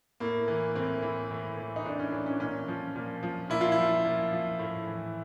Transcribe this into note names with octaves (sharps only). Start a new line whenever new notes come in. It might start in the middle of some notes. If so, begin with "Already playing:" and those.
A2 A#3
E3
A2 C4
E3
A2
E3
D#4
A2 D4
C#4
E3 D4
C#4
A#2 C#4
F3
A#2
F3
A#2 E4
F4
E4
F3
A#2
F3
A2
E3